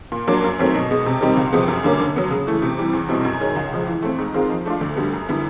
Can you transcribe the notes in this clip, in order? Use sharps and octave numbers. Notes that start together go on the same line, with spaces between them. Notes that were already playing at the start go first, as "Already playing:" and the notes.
A#2
F#3 A#3 D4
F#2
D#3 F#3 A3 C4
B2
G#3 B3
C3
D#3 G3 C4 D#4
C#2
C3 F3 G#3 B3
F#2
D3 G3 A#3 C#4
D3
F#3 B3
C#3
E3 A3
C3
E3 G3
E2
B2 G3 C4 E4
F#2
D#3 G#3 C#4
C#2
C#3 F3 G#3
E3
A3 C4
G#2
D#3 G#3 C4 F4
F3
A3 D4 F4
D2
D3 G3 B3
F#2
D3 G3 B3 E4